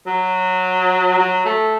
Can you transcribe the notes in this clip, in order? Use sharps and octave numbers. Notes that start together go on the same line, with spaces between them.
F#3
F#3
A3